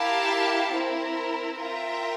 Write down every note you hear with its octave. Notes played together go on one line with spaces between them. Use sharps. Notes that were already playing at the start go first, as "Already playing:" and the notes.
Already playing: E4 G4 A#4 F5 A5
C4 E4 A#4
F4 A#4 E5 G5